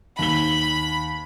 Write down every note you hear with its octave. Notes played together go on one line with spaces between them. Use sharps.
D#2 B5 G7